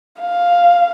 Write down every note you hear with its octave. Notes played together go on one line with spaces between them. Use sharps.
F5